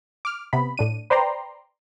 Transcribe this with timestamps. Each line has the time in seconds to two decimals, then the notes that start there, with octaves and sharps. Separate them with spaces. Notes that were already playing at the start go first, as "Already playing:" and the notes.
0.25 D6 F6
0.53 C3 B3 B5
0.77 A2 D4 D#7
1.10 B4 C5 D5 G5 A#5 C6